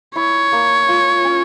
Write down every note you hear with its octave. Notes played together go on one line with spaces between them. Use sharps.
E4 C#5
A#3
F4
C#4